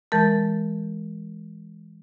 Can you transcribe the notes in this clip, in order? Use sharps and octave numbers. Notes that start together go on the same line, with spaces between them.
E3 G#3 A#4 A5 G6 A6